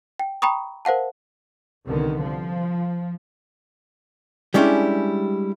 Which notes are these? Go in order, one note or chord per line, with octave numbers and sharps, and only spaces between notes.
G5
G5 A#5 B5 C#6 D#6
A#4 C5 F5 F#5 A5
C2 D3 D#3 B3
F3
G3 G#3 C#4 D4 E4 G4